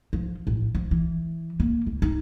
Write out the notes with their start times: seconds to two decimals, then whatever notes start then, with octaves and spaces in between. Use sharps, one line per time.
0.13 F3
0.47 A1
0.75 F3
0.91 E3
1.60 A#3
1.87 C#2
2.02 D#4